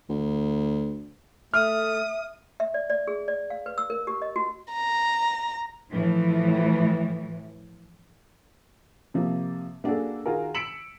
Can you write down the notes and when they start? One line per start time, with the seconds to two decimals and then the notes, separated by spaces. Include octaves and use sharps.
0.10 D2
1.54 A3 E5 D#6 F6
2.60 E5
2.74 D5
2.90 D5
3.08 G#4
3.28 D5
3.50 F5
3.66 B4
3.78 E6
3.90 A#4
4.07 G4
4.22 D#5
4.36 F#4
4.73 A#5
5.91 A2 E3 F3
9.14 C3 F3 A#3
9.84 A#3 D4 F#4 G#4 A4
10.26 D#3 F4 F#4 G#4 A#4
10.55 E6 B6 C#7 D7 E7 F#7